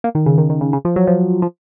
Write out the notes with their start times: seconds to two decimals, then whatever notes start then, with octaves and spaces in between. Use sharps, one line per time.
0.04 A#3
0.15 D#3
0.26 C#3
0.38 D#3
0.50 D#3
0.61 C#3
0.73 C#3
0.85 F3
0.96 F#3
1.07 F3
1.42 F3